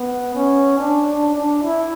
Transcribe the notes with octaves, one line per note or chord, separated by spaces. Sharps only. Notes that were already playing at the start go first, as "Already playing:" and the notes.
Already playing: B3
C#4
D4
D4
D4
E4